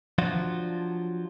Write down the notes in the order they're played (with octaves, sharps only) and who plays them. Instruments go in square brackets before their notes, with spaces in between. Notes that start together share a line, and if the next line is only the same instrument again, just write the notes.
[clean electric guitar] F3 F#3 D4 F4 F#4